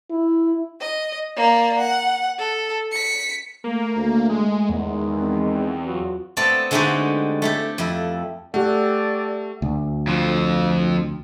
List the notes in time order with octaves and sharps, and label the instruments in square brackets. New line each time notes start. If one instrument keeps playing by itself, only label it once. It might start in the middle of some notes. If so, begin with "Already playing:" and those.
[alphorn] E4
[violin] D#5
A#3 D5
F#5
A4
B6 C#7
[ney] A3 [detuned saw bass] A#3
[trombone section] D2
[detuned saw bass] G#3
[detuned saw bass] E2 [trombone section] D#3 G#3
[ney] C4
[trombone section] F#3 F4 F#4
[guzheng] A3 B3 C4 A4 D5
D3 G#3 A3 D#4 F#4 G4
A3 E4 G4
F2 E4
[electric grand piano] A3 [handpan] G4 F#5 [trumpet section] A4 D5
[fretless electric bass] D2
[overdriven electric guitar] F2 F3